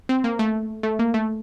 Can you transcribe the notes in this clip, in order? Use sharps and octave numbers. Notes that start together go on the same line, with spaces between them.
C4
A#3
A3
A3
A#3
A3